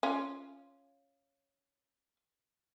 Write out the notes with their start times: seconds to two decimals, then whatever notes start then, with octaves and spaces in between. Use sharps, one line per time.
0.03 C#4 F4